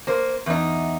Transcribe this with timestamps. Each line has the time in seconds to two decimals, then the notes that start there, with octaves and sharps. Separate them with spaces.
0.07 A#3 C5
0.46 E2 D#4